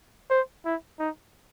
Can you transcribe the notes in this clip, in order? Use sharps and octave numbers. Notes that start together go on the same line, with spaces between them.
C5
E4
D#4